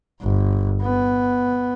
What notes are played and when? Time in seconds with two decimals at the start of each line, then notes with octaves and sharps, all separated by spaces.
0.22 G1
0.83 B3